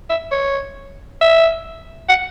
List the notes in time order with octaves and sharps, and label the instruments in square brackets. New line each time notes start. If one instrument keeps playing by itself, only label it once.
[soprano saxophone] E5
C#5
E5
F#5